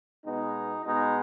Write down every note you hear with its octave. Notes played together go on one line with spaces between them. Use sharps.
B2 G#3 B3 D#4
B2 G#3 B3 D#4